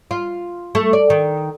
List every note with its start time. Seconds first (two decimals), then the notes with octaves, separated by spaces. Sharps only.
0.11 F4
0.75 A3
0.93 D5
1.10 D#3